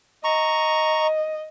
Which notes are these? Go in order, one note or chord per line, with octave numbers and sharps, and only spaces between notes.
D#5 A#5 C#6